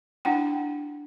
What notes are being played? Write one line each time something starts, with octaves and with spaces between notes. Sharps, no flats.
D4 E4 F#5 G5